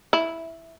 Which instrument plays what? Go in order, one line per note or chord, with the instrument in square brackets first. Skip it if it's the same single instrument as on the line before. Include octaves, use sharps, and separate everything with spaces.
[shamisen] E4